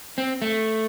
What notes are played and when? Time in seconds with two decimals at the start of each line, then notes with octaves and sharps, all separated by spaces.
0.18 C4
0.42 A3